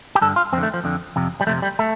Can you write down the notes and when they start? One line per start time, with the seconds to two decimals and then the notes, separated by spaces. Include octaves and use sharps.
0.15 G4
0.21 G2 D3 A4
0.36 F4
0.52 F2 C4
0.57 D3
0.63 A3
0.74 F3
0.84 F2 D3
1.16 F2 C3
1.41 G3
1.47 F2 C3 A3
1.62 G3
1.79 A3